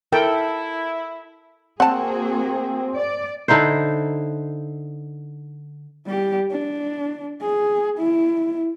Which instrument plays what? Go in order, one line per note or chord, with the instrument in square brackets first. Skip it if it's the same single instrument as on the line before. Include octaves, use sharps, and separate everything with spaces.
[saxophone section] E4 [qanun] A4 [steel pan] A#4 G5
[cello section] A#3 F#4 G#4 [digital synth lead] C4 [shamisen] F#5 A5
[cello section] D5
[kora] D3 D#4 E4 C5
[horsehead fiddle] G3 G4
D4
G#4
E4